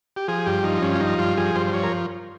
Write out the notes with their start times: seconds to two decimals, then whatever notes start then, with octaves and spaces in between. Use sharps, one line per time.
0.16 G4
0.28 F3 G#4
0.46 G2 G4
0.64 F3 D#4
0.82 G2 C#4
0.95 F4
1.00 F3 D#4
1.18 G2 F4
1.37 F3 G#4
1.55 G2 C5
1.67 C5
1.74 F3 C#5
1.83 A#4